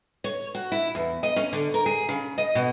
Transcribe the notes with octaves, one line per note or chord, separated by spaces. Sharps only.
C#5
F#4
E4
E2
D#5
C#4
D3
A#4
G#4
C#3
D#5
B2